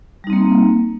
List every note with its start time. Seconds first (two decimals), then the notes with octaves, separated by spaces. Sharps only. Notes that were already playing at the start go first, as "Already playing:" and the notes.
0.24 G3
0.27 D#4
0.30 C4
0.33 A#3